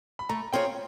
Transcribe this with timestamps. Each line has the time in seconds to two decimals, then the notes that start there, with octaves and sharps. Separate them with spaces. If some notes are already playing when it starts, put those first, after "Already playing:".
0.19 B5
0.29 A3 A#5
0.53 C4 F4 G#4 C#5 G5